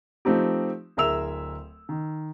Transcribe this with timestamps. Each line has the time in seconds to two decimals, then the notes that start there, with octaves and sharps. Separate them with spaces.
0.25 F3 A3 C4 D#4 G4
0.97 D1 G#4 A#4 E5 E6 F7
1.89 D#3